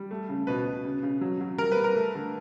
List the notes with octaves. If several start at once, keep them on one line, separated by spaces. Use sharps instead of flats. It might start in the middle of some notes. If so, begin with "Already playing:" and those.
Already playing: G3
A3
C#3
B2 B4
B2
C#3
C#3
F#3
F#3
G3 A#4
B4
G3
A#4
A3
D3